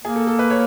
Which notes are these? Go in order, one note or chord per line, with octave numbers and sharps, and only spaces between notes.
A#3 G#4
A4
A4
B4
C#5